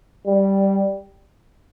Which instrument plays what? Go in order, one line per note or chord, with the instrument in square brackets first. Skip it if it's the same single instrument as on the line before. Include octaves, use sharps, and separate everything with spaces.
[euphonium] G3